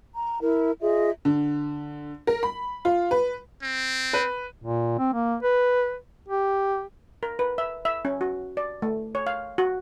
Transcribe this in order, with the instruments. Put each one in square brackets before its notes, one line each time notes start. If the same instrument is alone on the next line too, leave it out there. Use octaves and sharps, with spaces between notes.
[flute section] A#5
E4 A#4
F4 G#4 D#5 E5
[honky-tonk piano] D3
A#4
B5
F4
B4
[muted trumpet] C4
[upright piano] B4
[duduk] A#2
C4
A#3
B4
G4
[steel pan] A#4
B4
E5
E5
C#4
F#4
D5
A3
C#5
F5
F#4